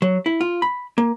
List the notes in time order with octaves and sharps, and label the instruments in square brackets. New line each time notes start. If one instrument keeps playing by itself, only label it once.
[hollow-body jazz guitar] F#3
E4
F4
B5
A#3